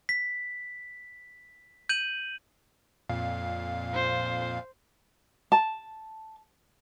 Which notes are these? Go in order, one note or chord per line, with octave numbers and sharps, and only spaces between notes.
B6
G6 D#7 F#7
F2 A#2 F5
C5
A5